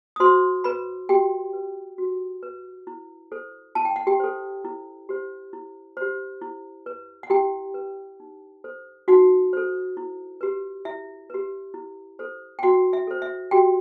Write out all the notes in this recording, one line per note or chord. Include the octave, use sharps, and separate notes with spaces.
D#6
F#4 C5 C6
B4 B5
F#4 G4 G5
B4
F#4
B4
E4
A4 C5
E4 A5
G5
F#5
G4 G5
A4 C5
E4
G4 C5
E4
G4 C5
E4
B4
F#5
E4 G4 G5
B4
D#4
A4 C5
D#4 F#4 F#5
A4 C5
E4
G4 B4
E4 E5
G4 B4
E4
A4 C5
G5
E4 F#4 F#5
E5
A4 C5
E5
F#4 G4 G5